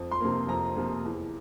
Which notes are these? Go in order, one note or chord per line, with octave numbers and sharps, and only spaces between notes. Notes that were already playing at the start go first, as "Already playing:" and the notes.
Already playing: F2
C6
C3 F3 A#3
F2 A#5
C3 F3 A#3
E2